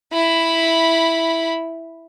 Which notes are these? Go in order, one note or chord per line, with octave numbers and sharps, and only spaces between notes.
E4 B5